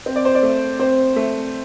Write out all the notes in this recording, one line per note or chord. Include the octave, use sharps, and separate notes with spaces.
C4
D5
C5
D5
A3
C4 C5
A3